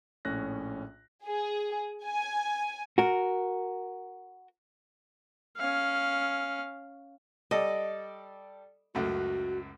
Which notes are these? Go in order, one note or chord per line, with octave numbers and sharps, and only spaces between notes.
A#1 A2 C#4 F#6 A#6
G#4
G#5
F#4 A#4
C#4 F5
G3 A4 D5 D#5
C#2 F#2 A3 F#4